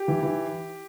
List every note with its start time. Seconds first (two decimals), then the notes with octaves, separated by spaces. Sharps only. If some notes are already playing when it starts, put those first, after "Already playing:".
Already playing: G4
0.08 E3
0.23 E3